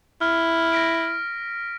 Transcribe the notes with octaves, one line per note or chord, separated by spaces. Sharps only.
E4 F6
A#6 B6 D7